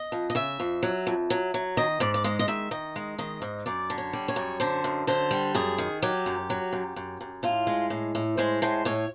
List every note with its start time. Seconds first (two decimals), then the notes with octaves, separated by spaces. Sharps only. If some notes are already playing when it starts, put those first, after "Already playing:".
Already playing: D#5
0.12 F2
0.30 D#5
0.35 C#3 E5
0.60 F2
0.83 F#3
1.07 F2
1.30 F#3
1.54 F#3
1.77 D#3 D#5
2.00 G#2 D5
2.14 D5
2.24 G#3 D#5
2.39 D#5
2.48 D#3 E5
2.71 D#3 D#5
2.96 G#3
3.18 D#3 D#5
3.42 G#2
3.66 F#2 D5
3.90 D3
3.98 C#5
4.13 G3
4.28 C#5
4.36 F#2
4.60 D3 C5
4.84 F#2
5.07 D3 C5
5.31 G3
5.54 F#2 G#4
5.78 D#3
6.02 F#3 G4
6.26 F#2
6.50 F#3
6.73 F#2
6.96 F#2
7.21 F#2
7.43 A2 F4
7.67 G#3
7.90 A2
8.15 A2
8.37 G#3 C5
8.62 A2 C5
8.85 A2 C#5